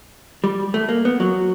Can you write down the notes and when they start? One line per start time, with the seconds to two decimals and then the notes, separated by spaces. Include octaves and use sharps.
0.44 G3
0.74 A3
0.89 A#3
1.05 B3
1.20 F#3